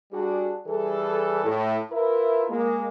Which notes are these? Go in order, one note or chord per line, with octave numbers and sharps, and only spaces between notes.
G3 D4 F#4 G#4
E3 G3 G#4 A4
A2
E4 F4 A#4 B4 E5
G#3 A#3